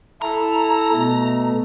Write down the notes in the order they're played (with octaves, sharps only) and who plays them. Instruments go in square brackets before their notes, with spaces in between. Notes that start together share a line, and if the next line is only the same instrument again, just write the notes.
[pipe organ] E4 A4 [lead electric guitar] A#5
[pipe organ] B2 A3